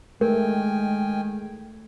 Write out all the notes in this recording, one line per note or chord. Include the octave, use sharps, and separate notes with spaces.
D#3 G#3 A3 A#4 G5 G#5